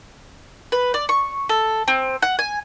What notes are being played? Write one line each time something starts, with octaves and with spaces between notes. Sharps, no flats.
B4
D5
C#6
A4
C4
F#5
G#5